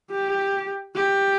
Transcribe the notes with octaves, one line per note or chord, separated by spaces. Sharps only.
G4
G4